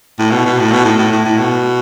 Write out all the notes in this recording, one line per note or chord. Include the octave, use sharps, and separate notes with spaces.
A2
B2
B2
A2
B2
A2
A2
A2
A2
B2